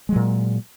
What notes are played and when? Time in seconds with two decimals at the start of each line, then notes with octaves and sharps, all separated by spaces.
0.09 G#3
0.12 F#3
0.16 A#2